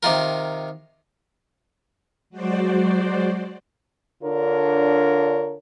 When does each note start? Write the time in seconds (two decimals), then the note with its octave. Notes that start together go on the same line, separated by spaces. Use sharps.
0.03 C3 D#3 F4 A#4
2.30 F#3 G#3 F#4 C5 D5
4.23 D3 D4 F4 A#4 C#5